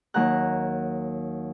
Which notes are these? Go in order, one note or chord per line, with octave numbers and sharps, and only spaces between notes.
D#2 F#3 F#5 A#5 F#6